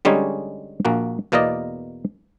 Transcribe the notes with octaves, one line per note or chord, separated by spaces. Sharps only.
D3 G3 G#3 C#4 D#4 C#5
A#1 A#3 F#4
E2 B2 A#3 A#4 D5 D#5